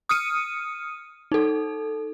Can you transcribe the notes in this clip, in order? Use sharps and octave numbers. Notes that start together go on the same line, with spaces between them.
D#6 F6 C#7 D#7
D#4 A4